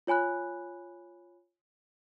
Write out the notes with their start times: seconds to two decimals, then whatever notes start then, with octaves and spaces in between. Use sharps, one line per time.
0.07 F4 C#5 G#5 B5 F#6